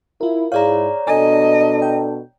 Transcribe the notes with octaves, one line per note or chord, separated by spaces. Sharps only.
E4 F4 A#4
G#2 E4 G#4 C#5 D5 F5 A#5
B2 D4 A4 D#5 G#5
G5